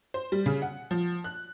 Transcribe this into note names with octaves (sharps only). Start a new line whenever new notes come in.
C5
G3
C#3
F#5
F3
F#6